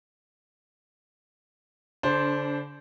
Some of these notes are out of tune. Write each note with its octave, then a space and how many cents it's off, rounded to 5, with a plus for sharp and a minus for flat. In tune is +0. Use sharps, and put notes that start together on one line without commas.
D3 -40 D4 -15 C5 +0